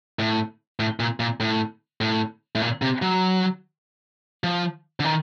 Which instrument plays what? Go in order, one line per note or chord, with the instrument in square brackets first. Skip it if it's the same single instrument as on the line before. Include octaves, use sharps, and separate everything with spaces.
[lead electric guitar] A2
A2
A#2
A#2
A2
A2
A2
A#2
C3
F#3
F3
D3
D#3